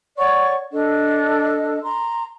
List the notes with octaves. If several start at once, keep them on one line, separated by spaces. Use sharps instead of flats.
C#5 D5 F#5 C#6
D4 A4 D#5
A#5 C6